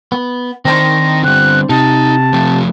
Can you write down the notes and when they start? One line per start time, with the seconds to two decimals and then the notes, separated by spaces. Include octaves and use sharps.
0.12 B3
0.65 D#3 C4 D4 D#4 C5 A#6
1.24 D3 G3 F#6
1.69 C3 D#4 A5
2.33 F3 A3